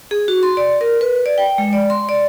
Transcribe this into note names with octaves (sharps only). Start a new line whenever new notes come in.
G#4
F#4
C6
D5
A#4
B4
D5
G5
G#3
D5
C6
D5